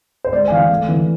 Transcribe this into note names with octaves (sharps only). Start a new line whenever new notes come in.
C5
G#3 D5
G#5
E3 F5
A3
E3